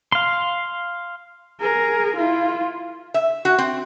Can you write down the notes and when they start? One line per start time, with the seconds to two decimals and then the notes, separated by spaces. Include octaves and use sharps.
0.12 F5 C6
1.60 G#4 A#4
2.16 E4 F4
3.14 E5
3.45 F#4
3.58 C4